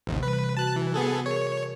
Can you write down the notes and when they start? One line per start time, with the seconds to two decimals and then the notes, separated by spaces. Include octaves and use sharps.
0.07 A1 D#2 C3
0.23 C3 E3 G3 B4
0.57 F#4 A5 F#6
0.76 E3
0.94 B3 G#4 A4
1.26 G#4 A#4 C#5